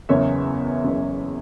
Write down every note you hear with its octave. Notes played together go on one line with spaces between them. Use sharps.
F#1 E2 C#3 C#5 E5
F#1 E2 C#3